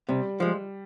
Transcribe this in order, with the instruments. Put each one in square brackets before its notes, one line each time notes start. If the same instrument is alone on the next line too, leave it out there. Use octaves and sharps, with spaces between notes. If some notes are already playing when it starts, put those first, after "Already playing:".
[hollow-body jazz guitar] C3 [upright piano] G3
[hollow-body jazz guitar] F3 G#3